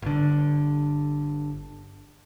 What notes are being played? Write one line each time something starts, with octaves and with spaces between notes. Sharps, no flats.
G1 D3